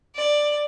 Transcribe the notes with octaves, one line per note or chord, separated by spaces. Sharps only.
D5